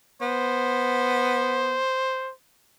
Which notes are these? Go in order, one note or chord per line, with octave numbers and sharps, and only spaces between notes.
B3 C5